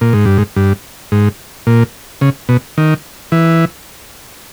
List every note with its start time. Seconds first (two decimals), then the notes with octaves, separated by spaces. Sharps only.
0.01 A#2
0.13 G#2
0.25 G2
0.38 G#2
0.56 G2
1.12 G#2
1.67 A#2
2.21 C#3
2.49 B2
2.78 D#3
3.32 E3